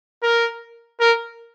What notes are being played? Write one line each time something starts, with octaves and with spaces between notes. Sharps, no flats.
A#4
A#4